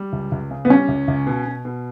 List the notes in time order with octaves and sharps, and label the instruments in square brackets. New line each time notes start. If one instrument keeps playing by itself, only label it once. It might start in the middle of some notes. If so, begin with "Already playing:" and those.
Already playing: [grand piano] G3
C#2
C#2
C#3
[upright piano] B3
[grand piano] G3 [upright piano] C#4
[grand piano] C#2
C#2
B2
B2
B2